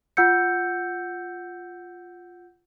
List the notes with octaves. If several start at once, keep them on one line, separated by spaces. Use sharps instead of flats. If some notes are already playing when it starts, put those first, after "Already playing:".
F4 F#5 E6 G6 C#7